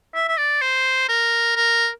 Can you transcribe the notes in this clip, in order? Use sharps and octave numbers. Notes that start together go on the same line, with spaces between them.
E5
E5
D5
C5
A#4
A#4